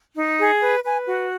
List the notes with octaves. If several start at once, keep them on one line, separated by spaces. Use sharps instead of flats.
D#4
G#4
B4
B4 G#5
F#4